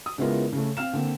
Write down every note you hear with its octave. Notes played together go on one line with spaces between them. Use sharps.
D#6
C#3 G#3 B3 E4 F4 A#4
C#3 A3
C4 F5 F6 E7
D3 A#3 C4